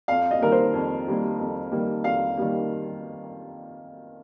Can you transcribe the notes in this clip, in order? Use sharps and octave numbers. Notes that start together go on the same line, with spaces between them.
F2 F5
D#5
D#3 G3 A#3 A#4
C5
F2
D#3 G3 A#3
F2
D#3 G3 A#3
F2 F5
D#3 G3 A#3